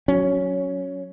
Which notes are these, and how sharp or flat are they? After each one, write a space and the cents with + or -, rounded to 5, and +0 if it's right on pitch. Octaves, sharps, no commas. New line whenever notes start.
F#3 +0 C#4 +5